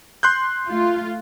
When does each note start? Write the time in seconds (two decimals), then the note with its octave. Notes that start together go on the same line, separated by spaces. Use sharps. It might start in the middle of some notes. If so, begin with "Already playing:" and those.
0.23 C6 F#6 G6
0.67 A3 F4